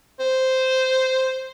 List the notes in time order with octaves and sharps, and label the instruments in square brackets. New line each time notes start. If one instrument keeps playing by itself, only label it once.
[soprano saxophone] C5